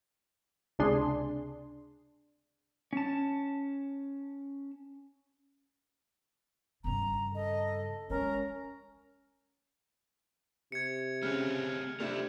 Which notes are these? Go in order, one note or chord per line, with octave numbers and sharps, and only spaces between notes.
C#2 C3 D4 G#4 C6
C#4 A5
G2 C#3 A#5
A4 D#5
G#3 C#4 A#4
C3 G#6 C#7
C#3 A3 C4 C#5 F6 F#6
C3 A3 C4 D4 F4 E5